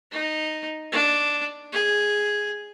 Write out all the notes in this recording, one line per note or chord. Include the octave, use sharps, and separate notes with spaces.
D#4
D4
G#4